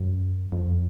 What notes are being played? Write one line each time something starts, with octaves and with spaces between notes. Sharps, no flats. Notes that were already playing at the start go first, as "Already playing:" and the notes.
Already playing: F#2
F2